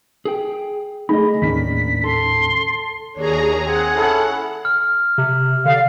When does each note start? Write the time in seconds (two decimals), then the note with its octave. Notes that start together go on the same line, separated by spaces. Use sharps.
0.25 G#4 G5
1.09 A3 D#4 G#4 D#5 B5
1.42 D#2 A2 D#3 A#3 C#4 D4 B6
2.04 A4 C6
3.15 D#2 D4 G#4 C#5 A#5
3.65 C4 G#4 F#5 G#5
3.96 C#4 E4 A4
4.65 F6
5.18 C3
5.65 D3 D5 F5